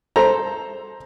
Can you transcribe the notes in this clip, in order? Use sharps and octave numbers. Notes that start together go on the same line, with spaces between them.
A4 C5 A#5